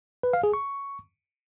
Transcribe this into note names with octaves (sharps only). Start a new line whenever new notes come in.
B4
F5
G#4
C#6